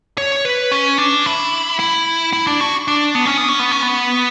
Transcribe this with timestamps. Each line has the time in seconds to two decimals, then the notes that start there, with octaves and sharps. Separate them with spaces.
0.18 C#5
0.45 B4
0.72 C#4
0.98 D4
1.26 E4
1.80 E4
2.33 E4
2.47 D4
2.61 F#4
2.88 D4
3.15 B3
3.26 C#4
3.37 B3
3.49 C#4
3.59 B3
3.72 C#4
3.82 B3